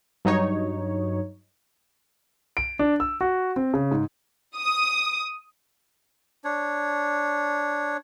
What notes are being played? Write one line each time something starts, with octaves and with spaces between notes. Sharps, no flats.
G2 F#3 D#4 C#5
D7
D4
E6
F#4
C4
C#3
G#2
D#6
D4 C#5